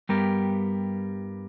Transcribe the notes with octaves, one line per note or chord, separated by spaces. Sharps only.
G2 G3 B3 G4 A#4